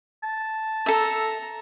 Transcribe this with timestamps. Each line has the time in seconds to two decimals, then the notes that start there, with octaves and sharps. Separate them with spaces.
0.24 A5
0.86 A4 E5 A#5